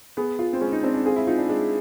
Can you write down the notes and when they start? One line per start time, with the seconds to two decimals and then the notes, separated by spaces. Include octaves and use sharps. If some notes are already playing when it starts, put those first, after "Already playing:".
0.17 B3 G#4
0.39 F4
0.53 C4
0.61 G#3 C#4
0.72 D#4
0.83 C4 D4
0.94 D4
1.05 F4 G#4
1.16 E4
1.27 D#4 F4
1.38 D4
1.49 G#3 D4